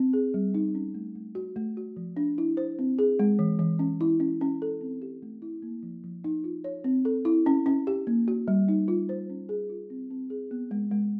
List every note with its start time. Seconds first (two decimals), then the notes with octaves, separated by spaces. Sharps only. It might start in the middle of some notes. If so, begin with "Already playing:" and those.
Already playing: C4
0.13 G#4
0.34 G3
0.54 D#4
0.75 C#4
0.94 A3
1.15 A3
1.35 F#4
1.56 A3
1.77 F#4
1.96 F3
2.17 D4
2.38 E4
2.57 C5
2.79 C4
2.99 G#4
3.19 G#3
3.39 E3
3.59 E3
3.79 C#4
4.01 E4
4.20 C#4
4.41 C#4
4.62 A4
4.81 C4
5.02 G4
5.22 A3
5.42 E4
5.62 A#3
5.83 F3
6.04 F3
6.24 D#4
6.44 F4
6.64 C#5
6.84 C4
7.05 A4
7.25 E4
7.46 C#4
7.66 C#4
7.87 G4
8.07 A#3
8.28 F#4
8.48 G3
8.68 D#4
8.88 F4
9.09 C5
9.30 C#4
9.49 G#4
9.70 F4
9.90 C4
10.10 C4
10.30 G#4
10.51 B3
10.71 G#3
10.91 G#3